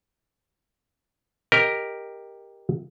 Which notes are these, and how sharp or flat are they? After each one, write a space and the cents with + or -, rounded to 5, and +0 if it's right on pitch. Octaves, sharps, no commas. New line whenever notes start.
G4 +10 A#4 +0 D#5 +0